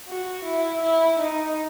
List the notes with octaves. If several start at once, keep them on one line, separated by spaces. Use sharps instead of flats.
F#4
E4
E4
D#4